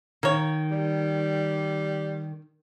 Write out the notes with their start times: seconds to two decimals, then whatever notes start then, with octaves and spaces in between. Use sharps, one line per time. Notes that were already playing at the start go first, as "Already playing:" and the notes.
0.23 D#3 A#3 C#5
0.71 G3